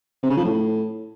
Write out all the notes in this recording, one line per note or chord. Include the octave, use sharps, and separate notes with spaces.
C3
C#3
F3
A2